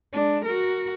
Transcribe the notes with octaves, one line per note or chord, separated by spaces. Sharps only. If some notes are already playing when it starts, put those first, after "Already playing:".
G#3 D4
F#4 A#4